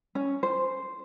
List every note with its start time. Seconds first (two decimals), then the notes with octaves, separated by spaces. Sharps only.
0.15 C#4
0.43 C5